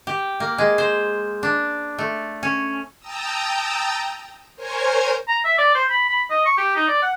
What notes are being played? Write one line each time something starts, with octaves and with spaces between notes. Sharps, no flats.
G4
A#3
G#3
C5
D4
A3
C#4
G5 A5 A#5 D#6 E6
A#4 C5 C#5 G#5 G#6
A#5
E5
D5
C5
B5
B5
D#5
C#6
G4
D#4
D5
F#5